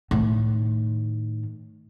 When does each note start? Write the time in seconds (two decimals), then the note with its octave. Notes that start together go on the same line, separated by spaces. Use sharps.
0.11 A2 D#3